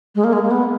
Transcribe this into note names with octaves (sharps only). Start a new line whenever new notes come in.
G#3
A#3
G#3
A#3
B3